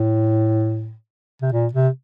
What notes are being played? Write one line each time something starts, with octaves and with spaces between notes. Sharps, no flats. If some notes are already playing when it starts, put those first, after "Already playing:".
Already playing: A2
C3
A#2
C3